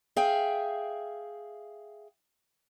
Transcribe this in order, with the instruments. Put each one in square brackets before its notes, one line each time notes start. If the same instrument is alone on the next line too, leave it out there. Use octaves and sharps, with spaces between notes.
[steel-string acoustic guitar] G#4 E5 F5 G5